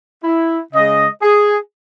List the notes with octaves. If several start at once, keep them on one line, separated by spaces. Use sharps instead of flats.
E4
C#3 G#3 D#5
G#4